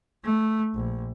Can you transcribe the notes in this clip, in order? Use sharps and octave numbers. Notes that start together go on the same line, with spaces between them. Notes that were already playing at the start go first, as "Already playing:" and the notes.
A3
A#1